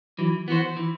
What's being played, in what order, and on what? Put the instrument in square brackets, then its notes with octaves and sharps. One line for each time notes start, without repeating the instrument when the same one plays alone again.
[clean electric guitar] E3 [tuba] F#3
[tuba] E3 [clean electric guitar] B3 F#4 C5
[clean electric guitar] E3